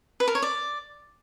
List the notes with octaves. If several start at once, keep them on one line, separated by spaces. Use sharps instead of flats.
B4
A#4
C#5
D5